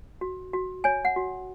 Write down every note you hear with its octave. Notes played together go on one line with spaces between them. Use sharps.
F#4
F#4
C#5 G#5
F#5
F#4